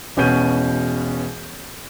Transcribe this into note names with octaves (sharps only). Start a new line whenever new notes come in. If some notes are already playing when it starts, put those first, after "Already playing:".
E1 B2 C#4 B4 G6 D#7